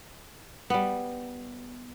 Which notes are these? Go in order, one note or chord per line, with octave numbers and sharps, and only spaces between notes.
G3 B3